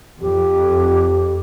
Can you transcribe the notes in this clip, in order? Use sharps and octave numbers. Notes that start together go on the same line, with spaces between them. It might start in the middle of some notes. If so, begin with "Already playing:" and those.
F2 G4